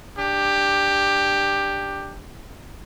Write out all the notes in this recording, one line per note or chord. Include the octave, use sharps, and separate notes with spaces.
D4 G4